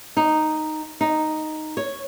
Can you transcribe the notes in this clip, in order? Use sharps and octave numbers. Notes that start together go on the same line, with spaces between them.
D#4
D#4
C#5